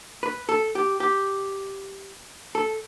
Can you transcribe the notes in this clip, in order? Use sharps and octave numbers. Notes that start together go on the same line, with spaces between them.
B4
A4
G4
G4
A4